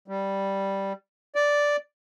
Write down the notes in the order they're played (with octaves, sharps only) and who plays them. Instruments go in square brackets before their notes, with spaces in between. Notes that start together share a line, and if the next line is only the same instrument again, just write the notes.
[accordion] G3
D5